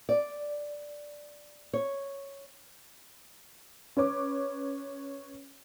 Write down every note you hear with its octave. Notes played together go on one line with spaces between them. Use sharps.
D5
C#5
C#4 B4 C#5 D6